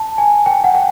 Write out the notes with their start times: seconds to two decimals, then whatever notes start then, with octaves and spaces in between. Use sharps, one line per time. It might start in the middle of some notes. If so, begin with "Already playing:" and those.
Already playing: A5
0.18 G#5
0.46 G5
0.64 F#5
0.75 G5